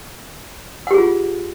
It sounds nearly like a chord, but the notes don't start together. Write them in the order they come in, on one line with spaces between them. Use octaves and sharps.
F#5 G4 G#4 F4